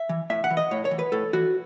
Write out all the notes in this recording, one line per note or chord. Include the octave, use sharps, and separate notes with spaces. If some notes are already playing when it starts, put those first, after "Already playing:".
Already playing: E5
E3
A2 E5
F#5
E3
D#5
A2 C#5
C#5
E3
B4
A2 A4
E3 F#4